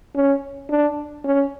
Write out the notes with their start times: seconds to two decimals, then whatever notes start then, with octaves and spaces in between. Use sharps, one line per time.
0.16 C#4
0.70 D4
1.25 C#4